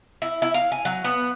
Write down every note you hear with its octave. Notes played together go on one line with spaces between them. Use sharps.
E4
E4
F5
G#5
F#3
B3